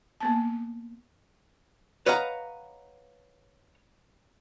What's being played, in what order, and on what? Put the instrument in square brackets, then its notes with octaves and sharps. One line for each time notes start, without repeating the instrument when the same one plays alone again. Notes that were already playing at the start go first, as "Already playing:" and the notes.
[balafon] A#3 B3 A5
[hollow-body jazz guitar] B4 C#5 D#5 F5 F#5 A#5